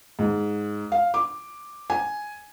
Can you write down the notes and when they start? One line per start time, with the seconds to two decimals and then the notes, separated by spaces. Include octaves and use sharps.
0.19 G#2
0.92 F5
1.14 D6
1.90 G#5